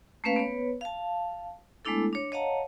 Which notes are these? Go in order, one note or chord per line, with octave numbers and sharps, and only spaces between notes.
A3 A#3 C#4 B4 F5
B3 B4 C#5
F5 A5
G#3 A3 B3 D4 E4 A4
D4 C#5
C#5 D#5 F5 F#5 A5 A#5